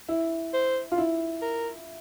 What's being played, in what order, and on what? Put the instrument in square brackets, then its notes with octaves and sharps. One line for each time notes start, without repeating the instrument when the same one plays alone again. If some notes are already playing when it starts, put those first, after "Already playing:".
[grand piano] E4
[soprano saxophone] C5
[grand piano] F4
E4
[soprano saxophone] A#4